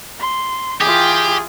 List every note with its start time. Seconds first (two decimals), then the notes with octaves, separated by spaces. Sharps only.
0.20 C6
0.81 E3 F4 G4 G#4